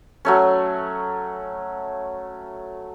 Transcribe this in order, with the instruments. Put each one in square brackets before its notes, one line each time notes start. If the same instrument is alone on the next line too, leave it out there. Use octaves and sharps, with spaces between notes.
[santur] F#3 A3 C#4